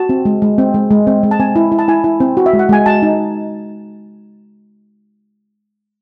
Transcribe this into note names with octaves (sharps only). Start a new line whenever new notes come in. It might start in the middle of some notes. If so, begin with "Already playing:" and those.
Already playing: F#4 A5
C4
G#3
G#3
C4
G#3
G#3
C4
G#3
A5
C4 G#5
E4
E4
A5
E4 G#5
E4
C4
F#4
E5
G#3
F#5
G#3 G#5
F#4 A5
D#4